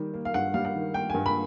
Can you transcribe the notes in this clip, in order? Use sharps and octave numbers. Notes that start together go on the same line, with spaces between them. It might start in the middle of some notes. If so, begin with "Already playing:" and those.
Already playing: D#3 G3
A#3
F5
G2 F#5
G3 F5
F#5
D#3
A#3 G5
G2 G#5
B5